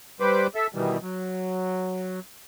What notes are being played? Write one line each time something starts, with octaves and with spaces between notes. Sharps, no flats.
G3 B4 C5 D6
A4 E5
B2 D#3 E3 G3
F#3